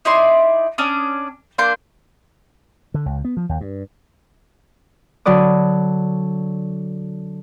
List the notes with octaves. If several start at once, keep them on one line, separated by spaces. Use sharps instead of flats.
D#4 E4 D5 C6
C#4 D4 D5 D#6
A#3 D4 C6 G6
D3
C#2
B3
F3
D#2
G2
D3 F#3 B4 D5 D#6